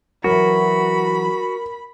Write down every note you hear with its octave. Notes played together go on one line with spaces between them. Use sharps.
E3 F#3 F#4 A#4 B5